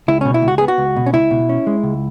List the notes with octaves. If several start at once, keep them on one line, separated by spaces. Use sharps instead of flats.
C#2 E4
B2 C#4
E4
C#2
F#4
B3 G#4
F#4
C#2
B2
C#4
C#2 E4
B2
C#4
G#3
C#2